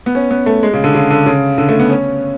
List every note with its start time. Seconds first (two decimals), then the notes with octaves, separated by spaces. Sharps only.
0.06 B3
0.15 C#4
0.31 B3
0.46 A3
0.63 G#3
0.74 C#3
0.84 D3
0.95 C#3
1.10 D3
1.26 C#3
1.58 D3
1.69 A3
1.80 B3
1.90 C#4